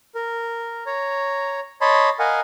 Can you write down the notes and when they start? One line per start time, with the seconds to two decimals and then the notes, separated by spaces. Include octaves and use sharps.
0.15 A#4
0.86 C#5 A#5
1.81 C#5 D#5 A5 B5 C6
2.19 A#4 D#5 F5 F#5 G#5